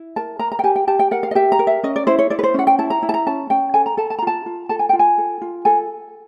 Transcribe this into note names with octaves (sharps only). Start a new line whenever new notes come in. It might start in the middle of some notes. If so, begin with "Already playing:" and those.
Already playing: E4
A#4 A5
A#4 A#5
A#5
G5
G4 G#5
G5
G4 A5
G5
A#4 F#5
F5
D#5
G4 E5
A#5
A#4
E5
C#4 D#5
D5
E4 C5
C#5
E4 D5
B4
C5
C#4 F#5
G5
E4 A5
A#5
E4
A5
A#5
C#4 A5
C#4 G5
A4 G#5
A#5
A4 A5
A5
A#5
F4 A5
F4
A4 A5
G#5
F4 G5
G#5
A4
F4
A4 G#5